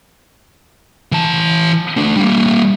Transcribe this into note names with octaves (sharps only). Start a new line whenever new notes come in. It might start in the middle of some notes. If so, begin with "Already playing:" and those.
E3 A5
A3 D4
G3 A#3